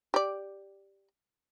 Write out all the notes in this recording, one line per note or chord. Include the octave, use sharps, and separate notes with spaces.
G4 D5